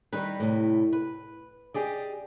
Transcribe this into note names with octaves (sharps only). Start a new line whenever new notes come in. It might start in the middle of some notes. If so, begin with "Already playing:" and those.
D#3 G3 D#4 B4
A2 C3
B4
G4 G#4 D5 D#5